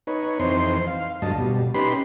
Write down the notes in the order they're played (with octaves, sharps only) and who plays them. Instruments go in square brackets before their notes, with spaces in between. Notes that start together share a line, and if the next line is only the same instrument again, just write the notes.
[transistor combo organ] D#4 B4 C#5
F2 E3 C4 D#4 C5 C6
F5
D2 G2 F#3 D#5 A5
B2 G3
C#4 D#4 G4 B4 B5 C6